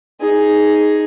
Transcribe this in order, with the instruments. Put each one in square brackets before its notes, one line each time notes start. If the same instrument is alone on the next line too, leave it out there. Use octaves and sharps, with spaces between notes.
[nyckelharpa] D#4 G#4